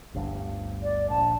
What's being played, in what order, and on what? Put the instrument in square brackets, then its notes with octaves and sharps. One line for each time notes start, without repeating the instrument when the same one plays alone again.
[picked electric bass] G1 D2 G2
[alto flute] D5
[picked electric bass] A#1 [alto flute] A5